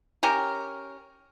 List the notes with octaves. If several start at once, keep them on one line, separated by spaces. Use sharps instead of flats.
C#4 G4 A#4